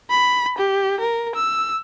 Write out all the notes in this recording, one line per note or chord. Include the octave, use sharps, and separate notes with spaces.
B5
G4
A#4
E6